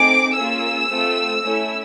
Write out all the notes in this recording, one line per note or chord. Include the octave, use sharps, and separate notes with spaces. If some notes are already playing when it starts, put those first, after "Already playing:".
Already playing: A3 C4 D#4 G#4 D6
A#3 C#4 F4 G#4 E6
A3 C4 F4
A3 C#4 E4